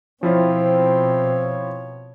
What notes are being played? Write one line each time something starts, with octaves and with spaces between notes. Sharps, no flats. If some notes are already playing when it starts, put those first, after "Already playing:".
B2 F3 C4 E4 F4 C#5